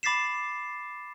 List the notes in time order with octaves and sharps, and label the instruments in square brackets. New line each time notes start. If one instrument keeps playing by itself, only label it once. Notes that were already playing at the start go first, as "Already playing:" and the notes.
[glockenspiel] B5 D6 A6 B6 C7 E7